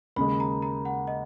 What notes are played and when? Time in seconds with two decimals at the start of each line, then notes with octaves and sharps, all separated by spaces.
0.16 D#2 C#3 G#3 B5
0.40 A#5
0.62 A#5
0.85 F#5
1.07 D#5